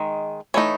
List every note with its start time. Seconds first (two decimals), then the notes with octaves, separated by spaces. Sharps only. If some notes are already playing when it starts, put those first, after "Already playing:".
Already playing: D#3 G#3
0.54 E3 A3 D#4 C#5